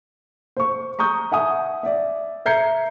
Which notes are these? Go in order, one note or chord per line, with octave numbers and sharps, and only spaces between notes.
C5 C#6
A#5 C#6 D#6 G6
E5 F#5 G#5 D#6
D5 E5
E5 A#5 G6 G#6 C7 C#7